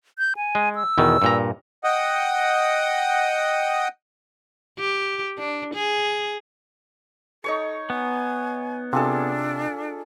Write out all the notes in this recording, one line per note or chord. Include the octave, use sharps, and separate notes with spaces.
G6
G#5
G#3
E6
E2 B2 D#3
G2 A#2 A#5
D#5 F#5 G5 D#6
G4
D4
G#4
D#4 A4 C#5 C#6
B3 G#5
C3 D4 F4 G#4 A4